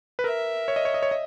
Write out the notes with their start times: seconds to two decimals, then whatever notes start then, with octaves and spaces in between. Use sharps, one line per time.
0.19 B4
0.24 A#4 E5
0.68 C#5
0.76 D#5
0.85 C#5
0.94 D#5
1.03 C#5
1.11 D#5